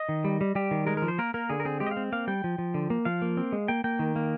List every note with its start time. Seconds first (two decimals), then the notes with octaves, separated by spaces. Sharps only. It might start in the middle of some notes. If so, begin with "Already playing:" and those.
Already playing: D#5
0.09 D#3
0.24 G3
0.41 G3
0.55 G3 G4
0.71 D#3
0.87 G#3 A#4
0.97 F3 A#4
1.08 C5
1.19 A#3 A#4
1.34 A#3 A#4
1.49 D3 G#4
1.60 A#4
1.65 C4 G#4
1.80 G#3 G4
1.87 D#5
1.91 F5
1.97 C4
2.12 A#3 F5
2.27 G3 G5
2.44 F3
2.58 F3
2.74 D3
2.90 A#3
3.05 F3 F5
3.22 A#3
3.37 C4
3.52 G#3
3.68 A#3 G5
3.84 A#3 G5
3.99 D#3
4.16 A#3